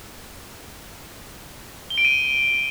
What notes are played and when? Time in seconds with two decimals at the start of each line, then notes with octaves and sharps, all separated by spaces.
1.90 G7
1.98 D7
2.05 D#7